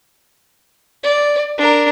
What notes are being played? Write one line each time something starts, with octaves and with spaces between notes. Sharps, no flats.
D5
D4 A#4